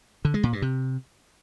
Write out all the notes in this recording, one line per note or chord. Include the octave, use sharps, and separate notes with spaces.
D3
G#3
A#2
G2
C3